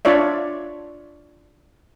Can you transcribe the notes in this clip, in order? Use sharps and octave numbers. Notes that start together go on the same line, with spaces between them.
D4 F4 C#5 D5 E5